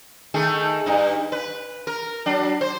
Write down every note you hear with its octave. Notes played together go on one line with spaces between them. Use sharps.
D#3 A3 G#4
G2 D#4
B4
A#4
F#3 D4
C5